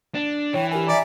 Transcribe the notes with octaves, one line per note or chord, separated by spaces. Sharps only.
D4
E3 C#5 G5
G4 A#4 G#5
D5 E5 G#5 A#5